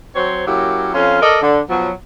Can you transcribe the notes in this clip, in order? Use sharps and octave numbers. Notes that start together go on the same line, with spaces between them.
F#3 C4 C5 C#5
F#3 A#3 C#4 E4 G4
F2 C#4 F4
A4 A#4 D5 D#5
D3
B2 F3 F#3